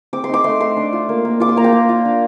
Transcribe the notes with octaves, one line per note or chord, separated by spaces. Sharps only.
C4 D6
C6
D#4 D6
A3 C6
A3 C6
D4
F4
A#3
A#3
F4 D6
C6
A#3 A#5
G5
A#3
F4
D4